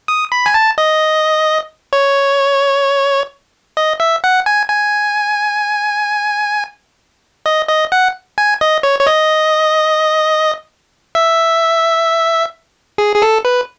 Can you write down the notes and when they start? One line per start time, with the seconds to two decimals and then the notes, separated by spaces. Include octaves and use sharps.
0.08 D#6
0.32 B5
0.46 G#5
0.54 A5
0.78 D#5
1.93 C#5
3.77 D#5
4.00 E5
4.24 F#5
4.46 G#5
4.69 G#5
7.46 D#5
7.68 D#5
7.92 F#5
8.38 G#5
8.61 D#5
8.83 C#5
8.99 C#5
9.07 D#5
11.15 E5
12.98 G#4
13.16 G#4
13.22 A4
13.45 B4